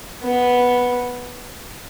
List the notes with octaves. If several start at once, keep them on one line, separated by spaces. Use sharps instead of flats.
B3